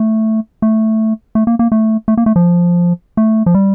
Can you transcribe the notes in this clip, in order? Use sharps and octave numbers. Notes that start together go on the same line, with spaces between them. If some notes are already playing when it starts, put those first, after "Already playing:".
Already playing: A3
A3
A3
A#3
A#3
A3
A3
A#3
A3
F3
A3
F3
G3